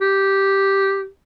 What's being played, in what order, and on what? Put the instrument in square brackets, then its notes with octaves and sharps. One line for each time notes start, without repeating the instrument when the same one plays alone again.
[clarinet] G4